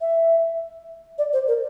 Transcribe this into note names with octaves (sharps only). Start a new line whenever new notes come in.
E5
D5
C5
A#4